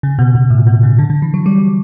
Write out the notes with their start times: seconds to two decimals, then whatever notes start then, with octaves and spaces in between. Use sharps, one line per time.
0.03 C#3
0.19 B2
0.35 B2
0.50 A2
0.67 B2
0.83 C#3
0.98 D3
1.10 D3
1.22 E3
1.34 F#3
1.46 G3